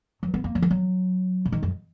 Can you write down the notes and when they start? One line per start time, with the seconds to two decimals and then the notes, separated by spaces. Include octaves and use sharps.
0.23 F#3
0.34 B3
0.44 A#3
0.55 F#3
0.62 F3
0.70 F#3
1.45 C#3
1.52 D#3
1.63 F#2